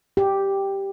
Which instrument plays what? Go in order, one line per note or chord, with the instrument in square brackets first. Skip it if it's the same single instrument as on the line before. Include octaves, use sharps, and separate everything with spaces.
[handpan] G4